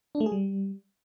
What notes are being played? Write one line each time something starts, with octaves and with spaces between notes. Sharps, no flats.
D4
A3
G#4
G3